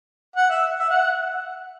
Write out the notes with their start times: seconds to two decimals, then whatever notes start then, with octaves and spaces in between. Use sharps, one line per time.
0.36 F#5
0.50 E5
0.79 E5
0.90 F#5